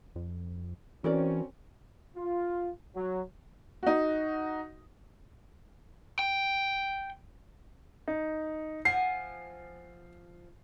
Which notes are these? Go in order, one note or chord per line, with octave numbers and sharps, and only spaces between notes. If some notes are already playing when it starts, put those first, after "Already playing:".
F2
E3 C4 C#4 F#4 A#4 D5
F4
F#3
D#4 F#4
G5
D#4
F3 F#5 G#5 C7